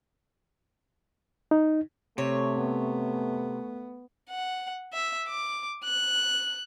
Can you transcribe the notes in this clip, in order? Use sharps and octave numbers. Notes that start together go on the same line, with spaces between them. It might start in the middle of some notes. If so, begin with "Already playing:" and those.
D#4
C3 A3 C#5
B3
F#5
E5
D6
F#6